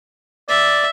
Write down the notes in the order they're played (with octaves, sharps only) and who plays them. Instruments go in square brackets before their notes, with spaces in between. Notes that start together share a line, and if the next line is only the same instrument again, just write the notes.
[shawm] D5 [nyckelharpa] E5